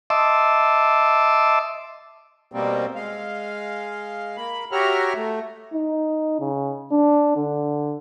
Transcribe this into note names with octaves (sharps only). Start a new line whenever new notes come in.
D#5 E5 A5 C6 D6 E6
B2 G3 A#3 C4
G#3 F5
A#3 B5
F#4 G4 C#5 E5 A#5 F6
A3
D#4
C#3
D4
D3